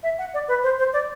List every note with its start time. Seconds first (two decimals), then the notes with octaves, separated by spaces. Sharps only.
0.03 E5
0.18 F#5
0.34 D5
0.48 B4
0.63 C5
0.79 C5
0.93 D5